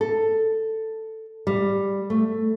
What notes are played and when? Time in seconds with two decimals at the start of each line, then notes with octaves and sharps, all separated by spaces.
0.01 A4
1.47 G3
2.10 A3